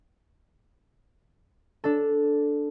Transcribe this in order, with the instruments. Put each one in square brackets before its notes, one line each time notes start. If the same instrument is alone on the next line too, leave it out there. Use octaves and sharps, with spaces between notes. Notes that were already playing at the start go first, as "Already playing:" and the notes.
[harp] D4 A4